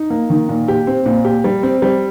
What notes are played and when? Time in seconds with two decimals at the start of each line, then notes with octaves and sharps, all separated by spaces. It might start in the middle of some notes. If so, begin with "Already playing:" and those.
Already playing: D#4
0.10 A#3
0.30 D#3
0.49 A#2
0.68 G4
0.87 C4
1.06 A#2
1.25 G4
1.44 G3
1.63 C4
1.82 G3